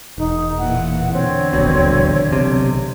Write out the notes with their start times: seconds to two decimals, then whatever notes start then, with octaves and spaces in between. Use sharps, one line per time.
0.18 E1 D#4
0.58 A#2 E3 F#5
1.13 E2 D3 C4 C#5
1.53 D#1 A#1 B2
2.31 B1 C3